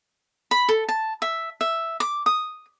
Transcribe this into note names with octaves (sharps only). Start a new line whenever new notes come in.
B5
A4
A5
E5
E5
D6
D#6